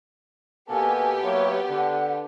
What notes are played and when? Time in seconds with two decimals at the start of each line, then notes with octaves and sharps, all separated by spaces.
0.69 B2 A#3 B3 G4 A4 G#5
1.23 F#3 A#3 E4 C#5
1.70 D3 F#5